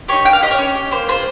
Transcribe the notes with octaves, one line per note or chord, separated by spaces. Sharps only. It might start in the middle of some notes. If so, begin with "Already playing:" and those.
D#4 G4 C#5
C#4 G5
F5
G4 D#5
C#5
C#4
G4
A#3 C5
F4 G#4 C5